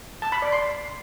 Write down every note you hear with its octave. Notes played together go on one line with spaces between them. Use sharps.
A5
B5
D5
C6